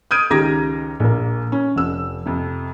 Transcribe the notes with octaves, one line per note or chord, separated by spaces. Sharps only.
D#6 F6 G6 G#6 D7 D#7
C#2 D#3 G4 A#5 G#6 A#6
A#1 A#3
C#4
F1 E6
F2 C3